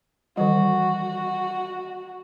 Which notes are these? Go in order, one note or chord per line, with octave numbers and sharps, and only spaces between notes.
D#3 E3 G3 F#4